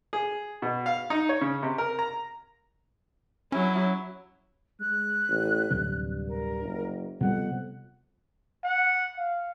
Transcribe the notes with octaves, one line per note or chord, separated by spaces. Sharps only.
G#4
B2
F5
D#4
C#5
C#3
C3
A#4
A#5
F#3 C#4 E4
G#3 F#6
A1
D1 G2 C3 C4
A#4
F#1
F2 C3 G3 B3 F#5
F#5
F5